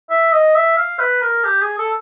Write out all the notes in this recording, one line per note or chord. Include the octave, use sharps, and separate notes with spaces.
E5
D#5
E5
F5
B4
A#4
G4
G#4
A4